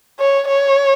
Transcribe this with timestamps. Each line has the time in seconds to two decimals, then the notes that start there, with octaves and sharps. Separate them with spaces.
0.20 C#5
0.48 C#5